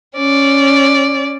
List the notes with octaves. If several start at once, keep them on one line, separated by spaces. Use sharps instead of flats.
C#4 D5